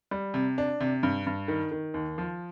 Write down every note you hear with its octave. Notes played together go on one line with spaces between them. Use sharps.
G3
C3
D4
C3
G2
G2
D#3
D#3
D#2
F3